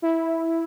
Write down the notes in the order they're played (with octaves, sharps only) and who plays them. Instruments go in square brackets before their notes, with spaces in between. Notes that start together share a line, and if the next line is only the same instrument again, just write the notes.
[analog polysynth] E4